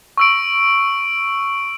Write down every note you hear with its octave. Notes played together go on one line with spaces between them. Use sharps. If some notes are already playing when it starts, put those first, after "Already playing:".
C#6 E6 D7